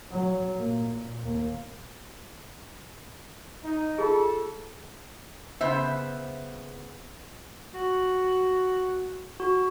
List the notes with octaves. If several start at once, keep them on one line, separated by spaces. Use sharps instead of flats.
F#3
A#2 A#3
A#2
D#2 A#3
D#4
F4 G#4 A4
C#3 B3 C5 E5
F#4
F#4